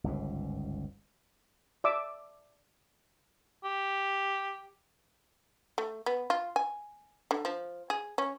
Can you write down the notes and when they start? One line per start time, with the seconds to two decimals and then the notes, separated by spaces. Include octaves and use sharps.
0.04 G1 C#2 G#2
1.84 D5 E5 D6 E6
3.65 G4
5.78 A3
6.06 B3
6.30 F4
6.56 G#5
7.31 D3
7.45 F3
7.90 G#4
8.18 C#4